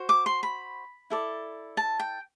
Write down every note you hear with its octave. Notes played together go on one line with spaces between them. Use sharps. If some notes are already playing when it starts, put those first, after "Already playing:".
Already playing: F#4 C5
D6
C6
B5
E4 A4 D5
A5
G5